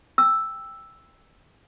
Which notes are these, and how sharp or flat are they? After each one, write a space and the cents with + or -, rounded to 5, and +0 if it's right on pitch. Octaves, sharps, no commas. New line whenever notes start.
G5 +20 E6 +0